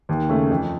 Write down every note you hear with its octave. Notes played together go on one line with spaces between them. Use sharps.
D#2
C#3 A3 C#4
F2